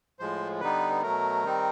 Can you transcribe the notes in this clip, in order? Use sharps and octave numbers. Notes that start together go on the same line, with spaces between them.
A2 F3 G#3 C5
D3 G3 B3 D#4 B4
B2 F#3 A3 A#4
D#3 G3 C4 D#4